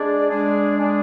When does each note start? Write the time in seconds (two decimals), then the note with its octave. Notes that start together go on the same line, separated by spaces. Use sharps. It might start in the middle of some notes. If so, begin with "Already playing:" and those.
Already playing: G#3 D4 G#4 D5
0.30 G#3 D4 G#4 D5
0.80 G#3 D4 G#4 D5